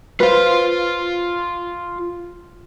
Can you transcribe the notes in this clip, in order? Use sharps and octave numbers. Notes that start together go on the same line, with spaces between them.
F4 B4 C5 F5